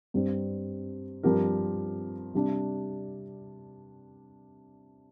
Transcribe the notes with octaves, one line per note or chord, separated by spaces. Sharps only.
G2 G3 C4
G2 F3 C4 G4 A#4
C3 G3 D4